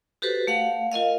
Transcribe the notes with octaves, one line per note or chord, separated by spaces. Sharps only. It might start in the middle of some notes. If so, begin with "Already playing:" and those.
F#4 G4 A4 B4 C5
A3 F5 F#5
F4 A#4 D#5 F5